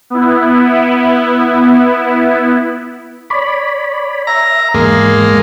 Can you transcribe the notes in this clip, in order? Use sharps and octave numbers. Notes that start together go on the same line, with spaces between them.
B3 E4
C#5 D5 B5
E5 A#5
E2 G#2 G#3 A#3